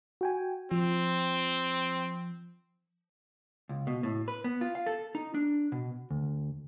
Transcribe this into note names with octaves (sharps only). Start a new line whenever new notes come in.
F#4 G5 G#5
F3 C4
C#2
B2
A2
B4
B3
F4
F5
A4
D#4
D4
B2
D2